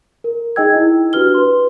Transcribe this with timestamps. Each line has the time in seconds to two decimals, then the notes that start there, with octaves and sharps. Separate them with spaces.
0.24 A#4
0.56 D#4 G#4 D#5 G5 E6 G#6
0.75 E4
1.13 D4 F#4 G4 B4 F6 G7
1.34 B4 C6